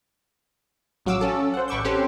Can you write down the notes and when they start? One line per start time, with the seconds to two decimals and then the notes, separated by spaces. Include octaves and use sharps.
1.06 A1 F#3 F#4 F5 D6 E6
1.21 C#4 A4
1.54 C5 F#5
1.68 A1 B4 C#6 D6 E6 G6
1.84 C4 C#4 G4 A4 B4 C5